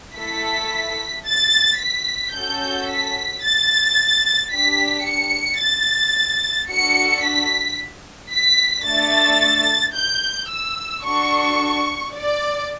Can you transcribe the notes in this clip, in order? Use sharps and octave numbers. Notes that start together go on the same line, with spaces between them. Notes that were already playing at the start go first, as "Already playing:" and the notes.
A3 E4 A4 B6
A6
B6
C#4 F#4 A4 G6
B6
A6
D4 G4 B6
C#7
A6
D4 F#4 A4 C#7
B6
B6
A3 D4 A4 A6
G6
E6
D4 F#4 A4 C#6
D5